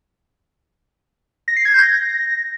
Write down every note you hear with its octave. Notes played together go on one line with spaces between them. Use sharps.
A#6
C7
G#6
G6
A#6